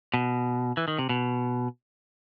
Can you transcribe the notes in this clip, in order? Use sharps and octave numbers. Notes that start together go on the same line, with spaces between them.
B2
E3
D#3
C3
B2